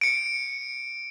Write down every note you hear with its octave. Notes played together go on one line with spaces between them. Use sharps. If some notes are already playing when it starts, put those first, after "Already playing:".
C#7 D7